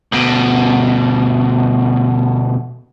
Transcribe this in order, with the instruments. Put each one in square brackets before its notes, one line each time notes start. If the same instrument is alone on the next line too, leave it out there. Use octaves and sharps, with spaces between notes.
[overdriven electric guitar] D2 B2